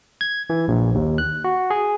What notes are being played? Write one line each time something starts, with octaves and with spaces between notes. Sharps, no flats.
G#6
E3
A#1
D#2
F#6
F#4
G#4